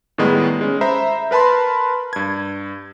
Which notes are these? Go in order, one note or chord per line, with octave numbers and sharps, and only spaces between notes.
A2 D#3 G3 G#3 B3
G#3 C#4
C5 E5 A#5 B5
A#4 B4 A5 B5 C6
G2 G#6